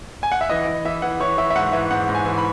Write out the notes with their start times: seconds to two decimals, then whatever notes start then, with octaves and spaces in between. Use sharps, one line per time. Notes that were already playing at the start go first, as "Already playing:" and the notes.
0.23 G#5
0.32 F#5
0.41 E5
0.50 E3 D#5
0.68 E3
0.85 E3 E5
1.02 E3 F#5
1.20 E3 C#5
1.38 E3 E5
1.50 E5
1.55 G#2 F#5
1.73 E3 E5
1.91 G#2 F#5
2.09 G#2
2.15 G#5
2.25 E3
2.38 B5